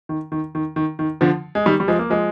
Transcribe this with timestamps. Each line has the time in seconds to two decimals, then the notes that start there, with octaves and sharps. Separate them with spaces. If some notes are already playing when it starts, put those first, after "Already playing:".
0.09 D#3
0.32 D#3
0.55 D#3
0.76 D#3
0.99 D#3
1.21 D3 F3
1.55 G#3
1.66 D#3 G3
1.80 G3
1.88 F3 G#3
1.99 A#3
2.10 F3 G#3